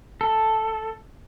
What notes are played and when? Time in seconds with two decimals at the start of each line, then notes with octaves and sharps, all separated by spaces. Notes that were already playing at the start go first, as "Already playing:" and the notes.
0.21 A4